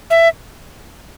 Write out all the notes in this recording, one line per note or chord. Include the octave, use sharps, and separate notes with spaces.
E5